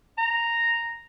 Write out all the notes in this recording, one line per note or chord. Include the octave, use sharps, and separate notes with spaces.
A#5